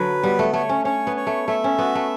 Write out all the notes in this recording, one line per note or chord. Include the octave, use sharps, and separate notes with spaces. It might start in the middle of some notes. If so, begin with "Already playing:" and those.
Already playing: D3 F#3 B4
G3 B3
A3
A3 C#5
C#4
C#4 C#5
B3
C#5
A3
A3 E5
C#4
B3 F#4
A3